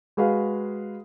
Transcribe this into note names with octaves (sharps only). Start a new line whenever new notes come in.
G#3 F#4 G#4 B4 F5